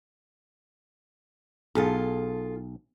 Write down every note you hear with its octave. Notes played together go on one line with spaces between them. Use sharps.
B1 F4 G#4 A4